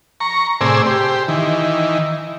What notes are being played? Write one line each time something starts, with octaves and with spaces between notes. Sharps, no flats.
A#5 C#6
A2 C3 G#4 C5 D5 E6
G4 C5
D#3 E3